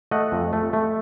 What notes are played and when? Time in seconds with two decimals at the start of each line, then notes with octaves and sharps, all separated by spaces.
0.11 A3 D#5 F#5
0.32 F2
0.53 A3
0.73 A3